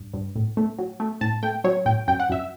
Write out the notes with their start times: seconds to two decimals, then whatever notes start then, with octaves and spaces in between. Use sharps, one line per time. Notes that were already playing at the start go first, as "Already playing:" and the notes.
Already playing: G2
0.13 G2
0.35 A2
0.57 A3
0.79 F#3
1.00 A3
1.21 A2 A5
1.43 A3 G5
1.64 F#3 C#5
1.86 A2 G5
2.07 F#2 G5
2.20 F#5
2.29 F#2 E5